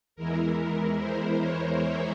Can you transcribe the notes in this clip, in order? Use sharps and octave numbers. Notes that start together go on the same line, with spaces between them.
E2 E3 G#3 E4 A#4
C5
A#4 C#5
C5 E5